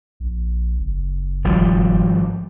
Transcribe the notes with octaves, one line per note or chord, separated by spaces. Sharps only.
A#1
F#1
G#1 F3 G3